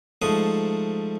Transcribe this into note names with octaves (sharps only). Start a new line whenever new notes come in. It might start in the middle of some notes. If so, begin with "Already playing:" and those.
G#2 F3 A3 D#6